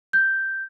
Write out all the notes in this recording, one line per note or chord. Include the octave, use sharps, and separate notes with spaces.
G6